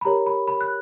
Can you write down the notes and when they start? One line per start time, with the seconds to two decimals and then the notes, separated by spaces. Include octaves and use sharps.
0.01 B5
0.05 G4 A#4 C#5 A#5
0.26 B5
0.48 B5
0.61 F#6